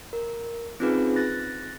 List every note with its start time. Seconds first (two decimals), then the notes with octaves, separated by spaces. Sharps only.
0.13 A#4
0.80 C4 C#4 D#4 F4 G#4 B4
1.16 F#6 A6 A#6